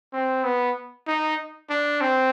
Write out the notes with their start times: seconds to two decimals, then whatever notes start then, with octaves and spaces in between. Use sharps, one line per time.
0.13 C4
0.44 B3
1.07 D#4
1.70 D4
2.01 C4